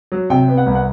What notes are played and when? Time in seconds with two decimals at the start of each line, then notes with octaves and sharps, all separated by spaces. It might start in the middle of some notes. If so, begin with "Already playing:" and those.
0.12 F#3
0.30 C3 G5
0.48 B3
0.58 F#5
0.66 C2
0.75 F#5